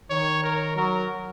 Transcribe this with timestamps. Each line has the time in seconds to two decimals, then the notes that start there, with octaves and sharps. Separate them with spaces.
0.10 D#3 C#5
0.44 A#4
0.76 F#3 A#4